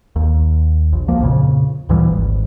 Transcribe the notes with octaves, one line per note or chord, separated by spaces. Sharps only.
D#2
A#1
D2 F3 A#3
F2 A#2 C#3
D2 A#2 E3 G3
G#1